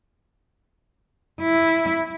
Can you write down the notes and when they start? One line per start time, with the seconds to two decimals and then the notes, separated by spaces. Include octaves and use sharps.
1.41 E4